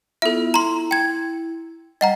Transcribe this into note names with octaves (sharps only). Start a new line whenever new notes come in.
B3 E4 F4 A4 E5
E4 A#5 C6
G5 G#6
G3 D#5 F#5 A#5